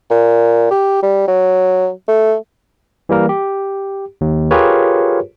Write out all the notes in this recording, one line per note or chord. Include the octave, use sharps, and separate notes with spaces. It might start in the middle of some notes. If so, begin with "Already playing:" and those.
A#2
G4
G3
F#3
A3
E3 G3 A#3 A#4
G4
D#2
F4 G4 G#4 A#4 B4 C#5